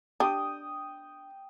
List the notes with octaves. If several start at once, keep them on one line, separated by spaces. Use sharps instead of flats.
D4 G4 G5 D#6